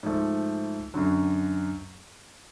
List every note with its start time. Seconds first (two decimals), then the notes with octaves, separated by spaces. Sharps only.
0.03 G#2 F3 A3
0.94 F#2 D3 F#3